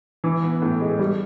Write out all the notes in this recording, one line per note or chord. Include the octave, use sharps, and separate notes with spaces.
E3
B3
A2
G#3
G3